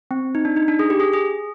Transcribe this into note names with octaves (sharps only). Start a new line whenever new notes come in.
C4
D#4
D4
D#4
D4
G#4
G4
G#4
G#4